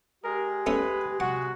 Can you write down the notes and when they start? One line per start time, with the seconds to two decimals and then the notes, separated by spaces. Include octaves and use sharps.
0.24 G#3 G4 G#4 A#4
0.66 A3 C#4 B4 E5
1.20 C3 F#4 F#5